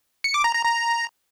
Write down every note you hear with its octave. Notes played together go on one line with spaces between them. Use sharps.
C#7
D6
A#5
A#5
A#5